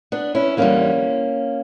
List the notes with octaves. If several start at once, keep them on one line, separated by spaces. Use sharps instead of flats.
B3 D4
C#4 E4
E2 D3 G3 A#3 C#4